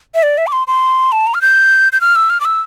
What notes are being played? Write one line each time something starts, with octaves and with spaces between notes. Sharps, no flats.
E5
D5
E5
D6
C6
C6
A5
A#5
F6
G6
G6
F6
E6
F6
D6
E6